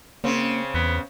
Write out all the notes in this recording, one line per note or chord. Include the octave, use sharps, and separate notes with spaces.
C#3 A#3 C4
E2 B3